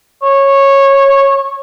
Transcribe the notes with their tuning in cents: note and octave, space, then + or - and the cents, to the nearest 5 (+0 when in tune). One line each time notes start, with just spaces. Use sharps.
C#5 -15